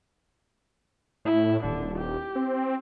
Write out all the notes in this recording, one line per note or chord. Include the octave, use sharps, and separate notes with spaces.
A2 E4
D#1 D3
G4
C4